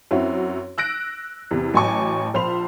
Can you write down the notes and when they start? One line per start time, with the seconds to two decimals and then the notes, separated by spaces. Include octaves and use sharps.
0.11 F#2 C4 C#4 E4 F#4
0.78 E6 F#6 A#6 D7
1.51 E2 C3
1.74 A1 F#3 G#5 A5 C#6 D6
2.34 A#1 F3 C5 B5 C6 F7